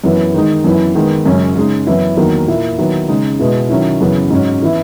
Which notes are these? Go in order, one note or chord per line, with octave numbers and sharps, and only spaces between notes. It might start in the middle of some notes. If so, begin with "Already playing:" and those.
F#2 E3 B3
D#3 G#3 D#4
F#2 E3 B3 E4
D#3 G#3 B3
F#2 C#3 G#3 C#4
C#3 G#3 D#4
F#2 E3 B3 E4
E2 D#3 F#3 A#3
A#2 A#3 E4
D#3 F#3 B3 E4
C#3 G#3 D#4
B2 G#3 B3 E4
D#3 F#3 C#4 E4
F#2 C#3 E3 B3
G#2 F#3 C#4
E3 B3 E4